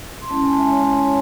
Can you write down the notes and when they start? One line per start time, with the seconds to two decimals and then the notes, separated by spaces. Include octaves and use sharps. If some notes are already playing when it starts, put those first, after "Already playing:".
0.22 C6
0.29 G#3 C#4 E4 A5
0.44 G#5
0.58 E5
0.72 C#5